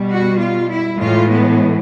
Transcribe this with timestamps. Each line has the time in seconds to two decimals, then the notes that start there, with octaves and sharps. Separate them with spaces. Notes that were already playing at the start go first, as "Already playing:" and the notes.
Already playing: B2 G3
0.11 F#4
0.40 F4
0.71 E4
0.99 A2 E3 G#3 F4
1.30 B3